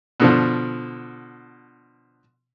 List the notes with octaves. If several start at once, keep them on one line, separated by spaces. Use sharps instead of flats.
B2 D3 F3